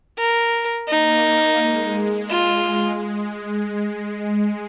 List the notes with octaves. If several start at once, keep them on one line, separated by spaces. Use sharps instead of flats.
A#4
A#3 D#4
G#3
F4